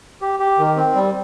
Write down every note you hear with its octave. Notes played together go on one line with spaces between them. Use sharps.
G4
G4
D#3
C4
G3